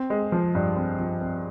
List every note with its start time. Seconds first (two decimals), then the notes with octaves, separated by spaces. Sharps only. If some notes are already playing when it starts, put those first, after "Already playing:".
Already playing: C4
0.10 G#3
0.32 F3
0.55 G2
0.76 C4
0.99 F3
1.21 C4